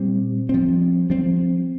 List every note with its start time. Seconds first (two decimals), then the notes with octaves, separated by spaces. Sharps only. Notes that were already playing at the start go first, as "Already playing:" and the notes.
Already playing: A#2 G3 C4
0.49 F3 C4
1.10 F3 C4